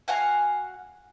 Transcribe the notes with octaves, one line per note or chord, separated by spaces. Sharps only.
F#4 F5 F#5 G#5